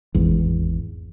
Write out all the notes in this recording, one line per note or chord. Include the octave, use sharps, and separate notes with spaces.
G#1 E2